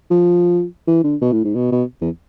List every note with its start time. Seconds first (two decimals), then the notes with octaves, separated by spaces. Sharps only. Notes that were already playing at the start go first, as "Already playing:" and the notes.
0.11 F3
0.87 E3
1.04 D3
1.21 B2
1.32 A2
1.44 G#2
1.55 B2
1.72 B2
2.01 E2